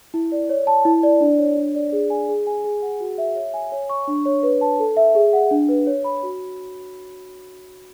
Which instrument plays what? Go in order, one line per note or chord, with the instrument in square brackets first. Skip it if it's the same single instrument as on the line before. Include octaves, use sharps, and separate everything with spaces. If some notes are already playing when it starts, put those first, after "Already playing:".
[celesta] E4
D5
C#5
A5
E4
D5
D4
C#5
D4
D5
G#4
G#5
G#4
G#5
G#4
F#5
F#4
E5
C#5
G#5
C#5
C#6
D4
C#5
B4
A5
A4
E5
G#4
F#5
D4
B4
C#5
B5
F#4